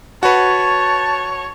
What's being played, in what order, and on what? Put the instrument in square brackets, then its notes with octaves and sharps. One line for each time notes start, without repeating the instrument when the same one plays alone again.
[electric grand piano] F#4 B4 [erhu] C#5 [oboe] A5